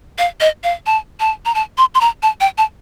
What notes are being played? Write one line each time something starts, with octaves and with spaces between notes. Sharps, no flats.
F5
D#5
F5
A5
A5
A#5
A5
C6
C6
A#5
A5
G5
A5